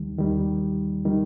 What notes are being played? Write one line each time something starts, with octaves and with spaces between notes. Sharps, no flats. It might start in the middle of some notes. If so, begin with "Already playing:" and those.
Already playing: D#2 D#3 G3
D#2 D#3 G3
D#3 G3